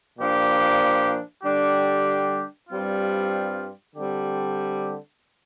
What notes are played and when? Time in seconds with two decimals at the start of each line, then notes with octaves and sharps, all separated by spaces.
0.18 A#2 F3 D4 G4
1.44 D3 G3 D4 G4
2.69 G2 G3 C4 F4
3.95 D3 G3 C4 G4